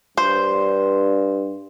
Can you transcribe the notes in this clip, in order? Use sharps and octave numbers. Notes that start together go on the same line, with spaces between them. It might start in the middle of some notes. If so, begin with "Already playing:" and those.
G2 C5